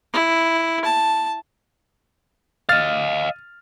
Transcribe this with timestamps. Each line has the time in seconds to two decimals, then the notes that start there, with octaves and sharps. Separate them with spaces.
0.13 E4
0.85 A5
2.69 D#5 F5 F6 A6